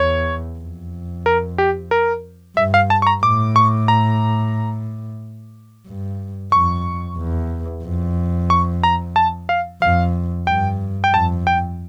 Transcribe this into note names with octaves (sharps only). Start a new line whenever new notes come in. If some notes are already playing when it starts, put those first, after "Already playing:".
Already playing: E2 C#5
F2
A#4
G4
A#4
G2 E5
F5
A5
C#6
A#5
A2 D6
C#6
A#5
G2
F2 C#6
E2
F2
C#6
A#5
A5
F5
F2 F5
G2 G5
G5
F2 A5
G5